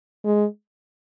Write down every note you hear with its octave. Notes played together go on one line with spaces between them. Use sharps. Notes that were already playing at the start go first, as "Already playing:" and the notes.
G#3